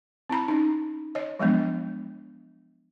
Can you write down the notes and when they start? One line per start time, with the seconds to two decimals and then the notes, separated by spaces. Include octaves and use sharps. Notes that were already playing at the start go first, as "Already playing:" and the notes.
0.29 C4 E4 A#5 B5
0.48 C#4 D#4
1.15 C#5 D#5
1.39 F3 F#3 G#3 B3 D4